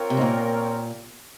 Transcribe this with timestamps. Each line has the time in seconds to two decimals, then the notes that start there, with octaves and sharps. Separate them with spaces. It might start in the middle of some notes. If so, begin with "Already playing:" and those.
Already playing: C4 F4 A#4 C#5 G5
0.10 C3
0.17 G#2
0.21 A#2